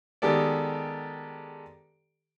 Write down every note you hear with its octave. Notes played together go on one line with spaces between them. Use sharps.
D#3 G#3 B3 G4 A4 D5